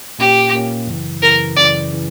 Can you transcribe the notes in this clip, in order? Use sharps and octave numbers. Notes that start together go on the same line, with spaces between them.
A#2 A#3 C#4 G4
A#2 A#3 C#4
F#2 C#3 E3
F#2 C#3 E3 A#4
F#2 C#3 E3 D5
C#3 E3